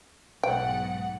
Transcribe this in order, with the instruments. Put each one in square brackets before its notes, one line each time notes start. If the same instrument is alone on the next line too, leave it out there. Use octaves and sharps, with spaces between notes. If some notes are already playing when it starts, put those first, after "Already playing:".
[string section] B1 G#2 F#5 [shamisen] G5